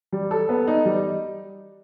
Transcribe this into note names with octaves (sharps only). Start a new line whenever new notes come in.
G3
A4
B3
D#4
G3